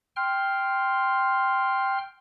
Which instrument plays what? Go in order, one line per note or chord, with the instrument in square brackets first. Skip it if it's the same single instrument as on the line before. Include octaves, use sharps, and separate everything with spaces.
[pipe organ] G5 C6 F6